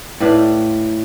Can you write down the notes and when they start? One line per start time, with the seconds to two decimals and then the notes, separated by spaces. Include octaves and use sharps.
0.20 A2 B4 D5 F5